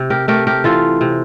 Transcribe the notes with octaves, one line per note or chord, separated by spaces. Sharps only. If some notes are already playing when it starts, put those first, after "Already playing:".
Already playing: C3
G4 A#4
A3 G4 A#4
G4 A#4
E3 F4 A4
C3